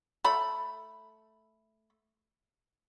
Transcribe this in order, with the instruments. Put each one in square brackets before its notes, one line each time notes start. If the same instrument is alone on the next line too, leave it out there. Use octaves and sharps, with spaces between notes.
[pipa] A3 B5